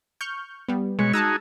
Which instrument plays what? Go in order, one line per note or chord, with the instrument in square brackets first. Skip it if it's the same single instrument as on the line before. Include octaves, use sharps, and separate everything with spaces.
[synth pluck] C#6 F6 G6
G3 B3
[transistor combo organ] B2 C#5 [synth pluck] G#3
[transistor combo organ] D#4 F#4 G#4 [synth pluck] A5 A#5 E6